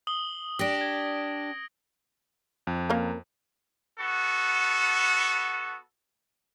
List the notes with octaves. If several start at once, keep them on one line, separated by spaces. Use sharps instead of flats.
D#6 F#7 G7
D4 G4 D#6 A#6 D7
G#6
F2
A#3 C#4 A#4
B3 F#4 A4